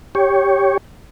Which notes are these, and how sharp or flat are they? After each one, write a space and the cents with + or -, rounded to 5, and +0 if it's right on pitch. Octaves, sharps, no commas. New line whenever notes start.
G4 +0 C#5 +0